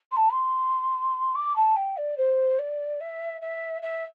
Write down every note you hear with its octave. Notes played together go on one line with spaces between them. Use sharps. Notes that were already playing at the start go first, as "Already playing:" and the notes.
C6
A5
C6
D6
A5
G5
D5
C5
D5
E5
E5
E5